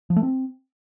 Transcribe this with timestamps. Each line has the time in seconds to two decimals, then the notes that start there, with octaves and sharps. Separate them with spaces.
0.10 F3
0.16 A3
0.23 C4